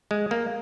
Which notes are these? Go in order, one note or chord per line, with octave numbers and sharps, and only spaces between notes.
G#3
A#3